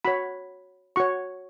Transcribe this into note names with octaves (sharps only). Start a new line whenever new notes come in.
F#4 C#5 B5
F#4 C#5 C#6